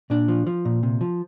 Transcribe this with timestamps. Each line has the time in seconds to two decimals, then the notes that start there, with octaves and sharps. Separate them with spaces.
0.10 A#2 D4
0.28 F3
0.47 F3
0.65 A#2
0.83 C3
1.01 F3